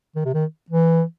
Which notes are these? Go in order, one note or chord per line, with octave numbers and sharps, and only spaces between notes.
D#3
C3
D#3
E3